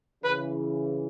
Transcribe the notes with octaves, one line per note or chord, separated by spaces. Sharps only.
C#3 E3 B4